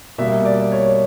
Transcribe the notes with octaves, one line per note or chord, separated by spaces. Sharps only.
B2 G3 A#3 E5
D5
C#5